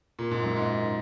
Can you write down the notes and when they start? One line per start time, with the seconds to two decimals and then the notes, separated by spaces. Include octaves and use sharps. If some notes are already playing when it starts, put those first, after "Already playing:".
0.19 A#2
0.31 G#2
0.43 F#2
0.56 G#2